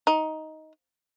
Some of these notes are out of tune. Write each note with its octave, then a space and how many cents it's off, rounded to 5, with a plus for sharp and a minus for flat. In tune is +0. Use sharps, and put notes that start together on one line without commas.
D#4 +10